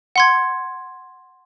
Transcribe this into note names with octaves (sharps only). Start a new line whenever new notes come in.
F#5 C6 G#6